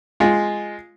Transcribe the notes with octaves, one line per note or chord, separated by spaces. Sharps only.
G#3 F4